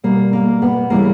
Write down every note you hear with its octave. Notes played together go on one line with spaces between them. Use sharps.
B2 G3 A#3
A#3
B3
C#3 E3 G3 A#3